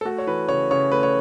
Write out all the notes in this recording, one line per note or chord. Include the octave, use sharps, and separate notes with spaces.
A4
A3 F#4
C#5
E3 B4
C#3 C#5
C#3 C#5
A3 B4
C#5